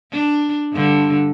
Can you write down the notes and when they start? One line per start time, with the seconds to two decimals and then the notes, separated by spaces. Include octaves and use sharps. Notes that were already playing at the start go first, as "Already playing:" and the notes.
0.11 D4
0.73 G2 D3